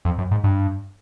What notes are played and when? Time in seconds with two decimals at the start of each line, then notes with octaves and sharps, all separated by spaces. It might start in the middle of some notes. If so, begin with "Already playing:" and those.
0.05 F2
0.18 F#2
0.31 G#2
0.44 G2